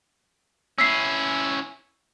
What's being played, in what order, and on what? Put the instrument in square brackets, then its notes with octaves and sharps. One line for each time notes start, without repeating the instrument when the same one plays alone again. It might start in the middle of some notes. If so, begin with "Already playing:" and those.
[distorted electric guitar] C#4 E4 [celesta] E6 B6 C7